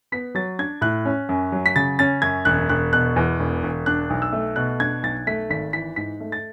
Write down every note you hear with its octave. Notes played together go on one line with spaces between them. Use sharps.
B3 B6
F#3 A6
D4 G#6
A2 F#6
C#4
F#2
F#3
B6
C#3 A6
C#4 A6
F#2 G#6
E1 F#6
E1 F#6
B2 F#6
E2
E1
E1
D4 F#6
B1
E6
A3
B2 F#6
D4 G#6
B1 A6
A3 B6
G#1 B6
E3 B6
G#2 B6
A3
A6